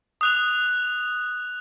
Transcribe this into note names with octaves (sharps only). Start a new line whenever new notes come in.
D#6 F#6 F7